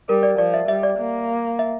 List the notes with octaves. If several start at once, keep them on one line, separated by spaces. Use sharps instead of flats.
G3 A#4
D5
F3 D5
E5
G3 E5
D5
A#3
E5